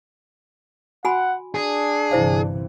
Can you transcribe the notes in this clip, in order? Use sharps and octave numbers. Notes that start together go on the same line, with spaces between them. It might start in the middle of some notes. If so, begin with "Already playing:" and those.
F#4 F#5 G#5 B5
D4 G#4
G1 C3 E3 E4 C5 F5